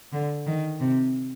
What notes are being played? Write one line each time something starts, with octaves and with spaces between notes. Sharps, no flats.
D3
D#3
C3